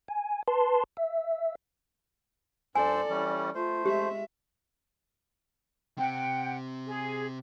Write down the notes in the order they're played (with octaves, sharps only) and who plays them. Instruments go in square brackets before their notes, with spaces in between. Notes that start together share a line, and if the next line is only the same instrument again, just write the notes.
[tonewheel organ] G#5
B4 A5 C6
E5
[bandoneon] G2 C5 E6 [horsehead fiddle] A4 D5 [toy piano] G#5
[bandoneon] E3 G3 C#4
[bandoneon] A3 C5 [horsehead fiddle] F4
[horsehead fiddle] G#3 E5 [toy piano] G4
[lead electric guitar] C3 C4 [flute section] F#5 G5
[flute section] G#4